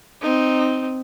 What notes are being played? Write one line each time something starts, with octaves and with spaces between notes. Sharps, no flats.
C4 D#4